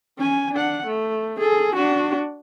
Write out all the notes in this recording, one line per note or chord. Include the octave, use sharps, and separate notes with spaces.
C#4 G#5
D4 F#5
A3
G#4 A4
D4 F#4